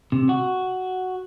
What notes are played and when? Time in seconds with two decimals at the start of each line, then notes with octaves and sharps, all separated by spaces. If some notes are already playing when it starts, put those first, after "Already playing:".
0.12 C3
0.29 F#4